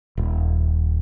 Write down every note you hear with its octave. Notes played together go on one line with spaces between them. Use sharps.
D#1